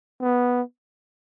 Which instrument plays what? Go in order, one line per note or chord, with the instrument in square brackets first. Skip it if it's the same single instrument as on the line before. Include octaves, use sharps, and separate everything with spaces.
[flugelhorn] B3